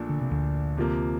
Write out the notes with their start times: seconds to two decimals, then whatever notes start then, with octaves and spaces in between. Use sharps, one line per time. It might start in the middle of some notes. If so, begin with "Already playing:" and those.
Already playing: A#1 A#2 A3 D4 A4
0.09 D3
0.21 C3
0.31 D2 D3
0.77 C3 F3 A#3